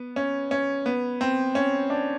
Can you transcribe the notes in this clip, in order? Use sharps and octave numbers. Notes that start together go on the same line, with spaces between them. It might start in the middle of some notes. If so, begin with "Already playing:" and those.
Already playing: B3
C#4
C#4
B3
C4
C#4
D4